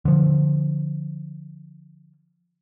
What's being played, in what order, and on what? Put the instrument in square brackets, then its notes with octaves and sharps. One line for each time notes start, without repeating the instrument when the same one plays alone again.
[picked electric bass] D3 F3